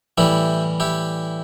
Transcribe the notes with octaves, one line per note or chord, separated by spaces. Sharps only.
A2 E3 G3 E4 G4
E4 G4